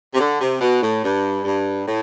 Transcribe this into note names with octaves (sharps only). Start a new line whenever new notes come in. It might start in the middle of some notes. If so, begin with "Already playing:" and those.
C3
D3
C3
B2
A2
G2
G2
A2